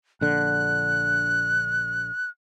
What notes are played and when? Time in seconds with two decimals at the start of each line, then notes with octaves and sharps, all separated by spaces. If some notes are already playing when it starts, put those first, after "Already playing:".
0.21 A#1 D3 F#6